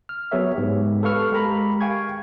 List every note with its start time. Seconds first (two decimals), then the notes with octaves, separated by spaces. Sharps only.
0.09 F6
0.32 F#3 B3 G#4 A#4 C#5 E5
0.56 G#2 B3 G4
1.03 A4 B4 F5 C#6 F6
1.31 G#3 G4 A#4 A#5 B5
1.81 F5 G5 G#5 C#6 G#6